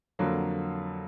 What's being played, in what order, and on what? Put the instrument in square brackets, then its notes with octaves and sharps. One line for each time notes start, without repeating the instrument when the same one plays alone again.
[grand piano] F2 D3 F#3 A#3